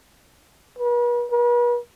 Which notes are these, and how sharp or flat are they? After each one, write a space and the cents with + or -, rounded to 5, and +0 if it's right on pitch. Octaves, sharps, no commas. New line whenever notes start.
B4 -45
B4 -40